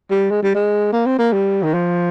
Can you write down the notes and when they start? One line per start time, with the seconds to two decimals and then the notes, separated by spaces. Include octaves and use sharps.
0.11 G3
0.31 G#3
0.43 G3
0.55 G#3
0.92 A#3
1.06 C4
1.19 A#3
1.32 G3
1.63 D#3
1.74 F3